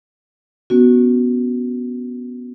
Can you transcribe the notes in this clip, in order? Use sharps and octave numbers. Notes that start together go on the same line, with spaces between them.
B3 C#4 F#4